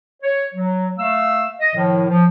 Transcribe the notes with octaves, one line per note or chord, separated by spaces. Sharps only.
C#5
F#3
A3 F5 E6
D#5
A2 D#3 F3
F3